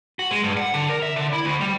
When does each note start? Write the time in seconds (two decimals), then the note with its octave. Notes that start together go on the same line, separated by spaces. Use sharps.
0.19 F#4
0.31 G#3
0.44 G2
0.57 F#5
0.74 D3
0.89 A#4
1.02 E5
1.16 D3
1.33 E4
1.45 D2
1.61 G3